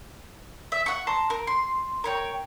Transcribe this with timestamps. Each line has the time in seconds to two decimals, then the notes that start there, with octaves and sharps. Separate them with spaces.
0.72 E5
0.86 F#5 C#6
1.07 A5 A#5 C6
1.30 A#4
1.47 C6
2.04 A#4 C#5 G5